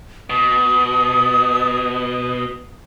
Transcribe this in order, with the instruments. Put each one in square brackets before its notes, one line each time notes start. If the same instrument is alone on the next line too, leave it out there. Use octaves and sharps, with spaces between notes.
[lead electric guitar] B2 [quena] D#6